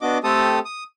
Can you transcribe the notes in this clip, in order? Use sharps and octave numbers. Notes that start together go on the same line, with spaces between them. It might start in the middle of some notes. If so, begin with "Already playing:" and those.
B3 D4 F#4 D#5 D6
A3 C4 G4 A4 A5 D#6
D#6